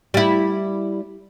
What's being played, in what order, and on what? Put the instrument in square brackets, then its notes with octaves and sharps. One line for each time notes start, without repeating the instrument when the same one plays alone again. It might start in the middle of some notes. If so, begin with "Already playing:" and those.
[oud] G3 E4